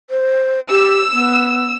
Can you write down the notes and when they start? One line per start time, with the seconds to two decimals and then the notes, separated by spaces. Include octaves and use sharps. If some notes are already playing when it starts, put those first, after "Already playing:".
0.10 C5
0.69 G4 E6
1.12 B3